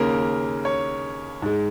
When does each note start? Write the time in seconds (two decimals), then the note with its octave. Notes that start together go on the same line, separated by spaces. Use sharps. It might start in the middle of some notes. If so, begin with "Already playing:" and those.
Already playing: D#2 C#3 A#3 A#4
0.65 C#5
1.42 G#2 G#3